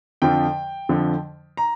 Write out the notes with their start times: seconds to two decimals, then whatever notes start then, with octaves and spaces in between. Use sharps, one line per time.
0.22 F2 D3 F3 G5
0.89 F2 D3 F3
1.57 A#5